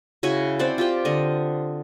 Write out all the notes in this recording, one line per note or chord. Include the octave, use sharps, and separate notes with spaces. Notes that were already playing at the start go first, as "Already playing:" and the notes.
C#3 E4 F#4 G#5
C4 C5 D5 F#5
F4 G4 G5
D3 D#5